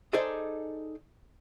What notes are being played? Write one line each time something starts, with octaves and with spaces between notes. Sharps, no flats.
D#4 G#4 A4 C5 D5 D#5